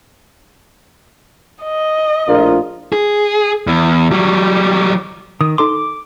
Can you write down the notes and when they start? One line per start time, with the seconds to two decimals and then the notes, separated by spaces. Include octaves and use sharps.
1.64 D#5
2.28 A#1 A2 F4 A#4
2.93 G#4
3.67 E2
4.11 F#3 G3
5.41 D#3 D#6
5.58 D#4 A4 C6 D6